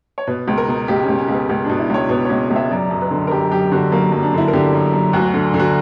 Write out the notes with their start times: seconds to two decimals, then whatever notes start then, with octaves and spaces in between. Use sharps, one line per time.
0.18 C#5
0.27 B2 B4
0.48 C#2
0.58 A#4
0.68 B2
0.88 C#2 G4
1.03 C#4
1.08 C#2
1.19 C#4
1.29 C#2
1.34 B3
1.49 C#2
1.64 B2 D4
1.79 E4
1.90 C#2 C#5
2.09 B2 B4
2.25 C#2 C#5
2.50 C#2
2.56 E5
2.71 F#2 D5
2.90 F#2
3.01 B4
3.11 D3
3.27 A#4
3.31 F#2 G4
3.51 F#2 G4
3.72 D3 F#4
3.92 F#2 A#3
4.12 F#2
4.22 D4
4.33 D3 E4
4.48 A#4
4.53 D3 G4
4.73 F#2
4.93 F#2
5.13 D2 F#4
5.34 D3
5.54 D3
5.59 F#4